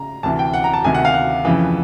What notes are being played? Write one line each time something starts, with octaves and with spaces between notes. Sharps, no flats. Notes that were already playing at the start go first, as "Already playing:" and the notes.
Already playing: C#3 A#5
D2 C3 E3 A5
G5
F#5
A#5
A5
D2 C3 D#3 G#5
F#5
F5
F#5
F2 C#3 E3